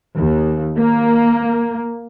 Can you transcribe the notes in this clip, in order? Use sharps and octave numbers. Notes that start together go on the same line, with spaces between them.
D#2
A#3